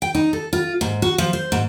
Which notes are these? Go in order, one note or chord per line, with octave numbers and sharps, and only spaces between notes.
G5
D#4
A4
F4
G#2
F#4
F3
C5
G#2